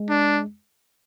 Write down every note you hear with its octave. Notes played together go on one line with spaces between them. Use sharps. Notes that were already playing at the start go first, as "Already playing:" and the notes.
Already playing: G#3
D4